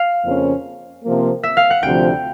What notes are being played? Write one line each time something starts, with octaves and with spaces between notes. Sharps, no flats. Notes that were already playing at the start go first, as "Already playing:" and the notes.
Already playing: F5
F2 C#3 F3 A#3 C#4
C3 F3 A#3
E5
F5
F#5
D2 C3 F3 G5